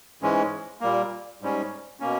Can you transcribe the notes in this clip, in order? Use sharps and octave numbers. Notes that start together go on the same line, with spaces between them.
G#2 E3 G#3 C#4
A#2 G3 A#3
G#2 G3 C#4
B2 A#3 C#4